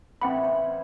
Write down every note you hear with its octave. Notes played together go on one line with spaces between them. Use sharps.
A2 C#3 E3 C4 F#5 B5
C5 G#5